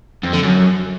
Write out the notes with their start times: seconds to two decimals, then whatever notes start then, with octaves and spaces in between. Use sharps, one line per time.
0.23 F2
0.33 D3
0.43 F#2